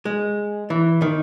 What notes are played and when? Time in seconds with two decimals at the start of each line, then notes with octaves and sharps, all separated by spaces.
0.05 G#3
0.70 E3
1.02 D#3